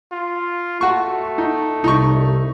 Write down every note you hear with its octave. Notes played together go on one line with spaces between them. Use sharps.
F4
A3 F#4 C#6
D#4
C2 D#4 C#6